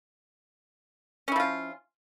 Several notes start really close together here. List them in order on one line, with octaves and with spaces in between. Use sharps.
C#4 E4 F3 F4